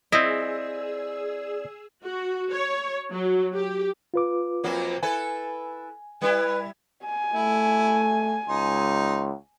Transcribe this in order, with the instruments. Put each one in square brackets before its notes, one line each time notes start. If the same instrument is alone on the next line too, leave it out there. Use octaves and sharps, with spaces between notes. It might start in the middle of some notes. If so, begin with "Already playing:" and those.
[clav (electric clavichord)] C4 E4 [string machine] G#4 E6 [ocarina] D5 [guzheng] D#5
[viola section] F#4
C#5
F#3
G4
[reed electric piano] F4 B4 D6
[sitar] F2 F#3 A#3
[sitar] E4 A4 B4 [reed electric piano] G#5
[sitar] G3 E4 [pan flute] B4
[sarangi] G#5
[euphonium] A3 [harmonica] E4
[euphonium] C#2 [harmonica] D#4 C6